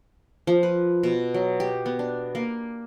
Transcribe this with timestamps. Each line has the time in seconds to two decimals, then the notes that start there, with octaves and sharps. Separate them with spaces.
0.47 F3
0.63 B4
1.03 B2
1.34 F#3
1.60 G4
1.86 B3
1.99 D4
2.35 A#3